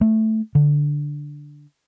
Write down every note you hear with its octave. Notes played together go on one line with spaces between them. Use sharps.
A3
D3